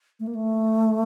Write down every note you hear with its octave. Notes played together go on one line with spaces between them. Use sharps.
A3
A#3
A3